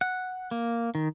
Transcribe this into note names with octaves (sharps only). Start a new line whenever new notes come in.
F#5
A#3
D#3